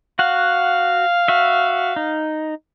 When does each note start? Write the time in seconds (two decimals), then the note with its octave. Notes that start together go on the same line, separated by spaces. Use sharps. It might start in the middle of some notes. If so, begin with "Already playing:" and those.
0.19 F#4 F5 F#5
1.28 F#4 E5
1.96 D#4